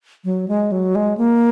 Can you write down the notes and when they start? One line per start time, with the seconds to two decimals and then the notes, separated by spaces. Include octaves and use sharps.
0.25 F#3
0.48 G#3
0.72 F#3
0.95 G#3
1.18 A#3